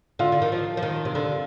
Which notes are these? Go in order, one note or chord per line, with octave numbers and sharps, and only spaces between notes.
D3 F4
D3
D#3
F3
F3
D#3
C3
D3